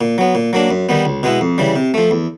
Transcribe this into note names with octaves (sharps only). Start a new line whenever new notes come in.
A#2
F#3 B3
A#2
F#3 A#3 D4
F#2
D#3 G3 B3
C#2
B2 G#3 B3 E4
F2
C#3 E3 G3
C3
F3 A3
E2